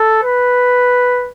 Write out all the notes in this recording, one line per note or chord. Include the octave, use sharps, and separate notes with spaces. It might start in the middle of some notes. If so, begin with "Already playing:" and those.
Already playing: A4
B4